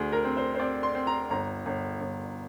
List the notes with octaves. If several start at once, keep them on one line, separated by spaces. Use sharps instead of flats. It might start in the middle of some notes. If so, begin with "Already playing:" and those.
Already playing: D2 G#4
A#4
C4
C5
C5
C4 D5
C6
C4
A#5
G1 A#5
G1
G1